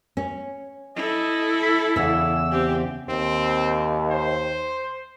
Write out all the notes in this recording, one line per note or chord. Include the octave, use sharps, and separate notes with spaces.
C#4
E4 A4 D#5
B5
E2 C#3 E6
C4 G4
D#2 C4
C5